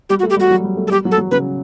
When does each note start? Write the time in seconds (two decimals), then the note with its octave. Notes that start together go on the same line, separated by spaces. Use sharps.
0.09 G3 G4
0.19 F#4
0.23 A3
0.30 G4
0.37 G3
0.40 F#4
0.51 F#3
0.64 G3
0.77 A3
0.87 A4
0.91 G3 G4
1.05 F#3
1.11 A4
1.18 F#3
1.31 C#3 B4